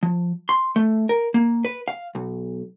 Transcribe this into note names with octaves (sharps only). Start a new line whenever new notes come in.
F3
C6
A3
A#4
A#3
B4
F5
B1